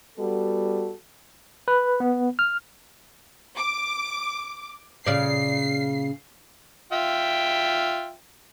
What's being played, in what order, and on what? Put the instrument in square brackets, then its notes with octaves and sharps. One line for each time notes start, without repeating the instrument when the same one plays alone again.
[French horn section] G3 B3 F#4 A4
[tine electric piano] B4
B3
F6
[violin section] D6
[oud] A#2 C#3 D5 [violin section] C7
[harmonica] F4 E5 G5